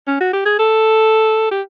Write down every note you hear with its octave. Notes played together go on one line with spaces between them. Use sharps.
C#4
F#4
G4
G#4
A4
G4